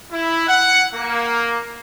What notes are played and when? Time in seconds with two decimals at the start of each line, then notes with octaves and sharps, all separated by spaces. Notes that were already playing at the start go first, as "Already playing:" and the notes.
0.11 E4
0.47 F#5
0.94 A#3